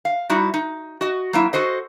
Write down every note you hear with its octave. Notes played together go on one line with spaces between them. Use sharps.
F5
G3 D#4 E4 F#4
D#4
F#4 D#5
F#3 A#3 E4
F#4 A4 C5 D#5